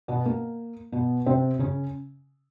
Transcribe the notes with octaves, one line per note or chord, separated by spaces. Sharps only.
B2 B3
A#3
B2 B3
C3 C4
C#3 C#4